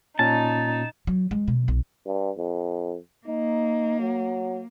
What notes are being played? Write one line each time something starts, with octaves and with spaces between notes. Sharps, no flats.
A#2 C#4 D#4 A5
F#3
G#3
B2
B1
G2
F2
A#3 D#4
F#3